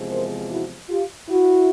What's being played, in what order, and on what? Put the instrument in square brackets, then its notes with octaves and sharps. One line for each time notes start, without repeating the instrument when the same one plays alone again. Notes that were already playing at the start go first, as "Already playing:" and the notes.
Already playing: [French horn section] E2 C3 F3 G#3
A#4 C5
E4 F#4
F4 G4
E4 F#4